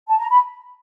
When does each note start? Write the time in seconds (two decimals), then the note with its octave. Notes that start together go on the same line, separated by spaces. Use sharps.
0.08 A5
0.18 A#5
0.30 B5